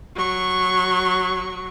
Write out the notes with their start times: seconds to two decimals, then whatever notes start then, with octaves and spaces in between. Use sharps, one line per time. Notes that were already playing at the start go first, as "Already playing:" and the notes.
0.16 F#3 C#6